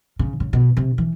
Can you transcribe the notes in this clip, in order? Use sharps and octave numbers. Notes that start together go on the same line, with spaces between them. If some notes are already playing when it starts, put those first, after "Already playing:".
C#3
C#3
B2
C3
E3